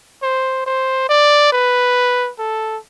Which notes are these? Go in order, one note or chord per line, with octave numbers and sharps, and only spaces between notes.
C5
C5
D5
B4
A4